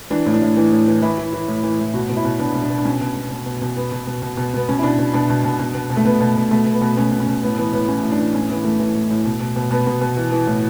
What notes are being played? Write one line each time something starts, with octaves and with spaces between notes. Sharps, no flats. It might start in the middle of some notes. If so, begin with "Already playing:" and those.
E3 D4
A2
D4
A2
E3
A2
E3
E3 E4
E3
E3
A2
E3
A2
B2 F#4
B2
E4
B2
B2 D4
B2
D4
B2
D4
B2 C#4
B2
B2
B2
B2
B2
B2 B3
B2
B2
B2
B2
B2 B3
B2 C#4
E4
B2 D4
B2
B2 D4
B2
B2
B2
B2
B2
A3
B2 B3
B2
B2
B2 A3
B2
B3
B2
B2 C#4
B2
C#4
B2
A2 B3
E3 B3
A2 B3
E3 C#4
A2
D4
E3
A2 C#4
E3 B3
E3 A3
E3
A2
A2
B2
B2
B2
B2 B3
B2
B2
E3
E3
A2